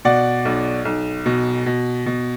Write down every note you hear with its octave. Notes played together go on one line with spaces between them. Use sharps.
B2 D5 F#5
B1
B1
B2
B2
B2